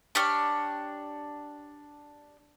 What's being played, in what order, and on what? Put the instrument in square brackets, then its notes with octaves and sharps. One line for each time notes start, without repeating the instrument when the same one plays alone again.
[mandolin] D4 G4 C#5 F6